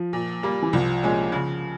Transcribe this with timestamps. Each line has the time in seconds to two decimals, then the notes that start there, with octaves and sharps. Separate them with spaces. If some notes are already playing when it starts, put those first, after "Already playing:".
Already playing: F3
0.13 A#2
0.43 G3 A#3
0.62 E3
0.73 C2 F3
1.03 A#2 G#3 C#4
1.32 C#3